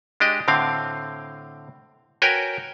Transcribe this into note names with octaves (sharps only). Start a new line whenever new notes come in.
G#3 D4 G4 D#5
A2 D3 C4 F5
F#4 A#4 B4 C#5 G5 G#5